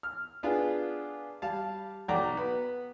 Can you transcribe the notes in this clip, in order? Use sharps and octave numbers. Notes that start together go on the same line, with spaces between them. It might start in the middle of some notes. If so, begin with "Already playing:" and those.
F6
B3 D4 F4 G#4
G3 F5 A5
B1 F#4 D5 G5 A#5 D6
B3